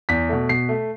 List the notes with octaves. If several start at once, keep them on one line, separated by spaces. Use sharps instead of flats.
E2 B6
B2 A3
B2 C7
A3